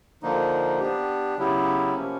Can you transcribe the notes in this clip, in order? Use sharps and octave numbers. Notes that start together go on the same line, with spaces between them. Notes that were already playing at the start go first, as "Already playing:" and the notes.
D3 F3 A#3 D#4
B3 D4 G4
C#3 F#3 B3 E4 G4
C3 F3 A#3 C#4